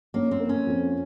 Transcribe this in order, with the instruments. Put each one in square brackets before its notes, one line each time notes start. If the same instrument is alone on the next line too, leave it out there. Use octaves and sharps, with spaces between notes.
[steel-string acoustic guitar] A#3 [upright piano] C#4
[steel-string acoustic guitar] C4
[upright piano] A#3
[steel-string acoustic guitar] C#4
[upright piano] F2